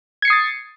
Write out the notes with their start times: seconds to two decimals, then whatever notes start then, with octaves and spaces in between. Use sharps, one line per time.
0.22 G#6
0.25 C#7
0.28 C7
0.30 D#6
0.33 A6